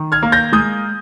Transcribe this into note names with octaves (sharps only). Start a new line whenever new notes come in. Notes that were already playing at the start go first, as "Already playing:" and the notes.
Already playing: D#3
F6 G#6
A#3
G6 A#6
G#3 D#6 G6